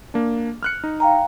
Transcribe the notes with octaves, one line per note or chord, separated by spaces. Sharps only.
A#3 D4
F6 F#6 C#7
D#4
F5 G5 A#5